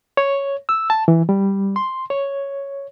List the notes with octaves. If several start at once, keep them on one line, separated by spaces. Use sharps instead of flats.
C#5
E6
A5
E3
G3
C6
C#5